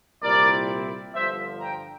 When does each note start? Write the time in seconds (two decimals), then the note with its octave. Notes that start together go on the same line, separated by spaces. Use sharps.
0.22 C2 A#2 G3 C4 E4 A#4 D5
1.15 G1 G2 D3 F3 C5 E5
1.60 G5 A#5